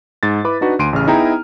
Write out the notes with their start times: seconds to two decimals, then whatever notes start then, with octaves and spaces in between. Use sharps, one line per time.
0.23 G#2 A6
0.44 E4 B4 B5 D6
0.61 D4 D#4 F#4 B4
0.79 D2 C6 D7 D#7
0.93 A1 C#3 F6
1.07 B3 D#4 E4 G#4 G5 A#5